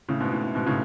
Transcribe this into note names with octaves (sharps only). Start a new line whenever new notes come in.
A2 C#3
G#2 B2
A2
A2
G#2 B2
A2 C#3